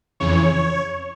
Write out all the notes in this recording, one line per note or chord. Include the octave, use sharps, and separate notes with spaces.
F2 C#3 E3 C#5